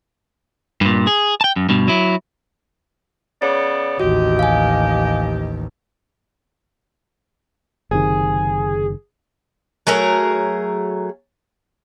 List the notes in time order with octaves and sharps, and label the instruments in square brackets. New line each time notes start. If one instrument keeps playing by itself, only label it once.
[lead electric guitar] G2 A#2
G#4
G5 A5
F#2
G2 B2
F#3 E4
[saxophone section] C#3 B3 D5 [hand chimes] C#5
[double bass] A1 D#2 [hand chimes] F#4 [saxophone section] G4 D#5
[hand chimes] F5 G#5
[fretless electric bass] F#1 C3 D#3 [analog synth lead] G#4
[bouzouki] F#3 A3 G#4 A#4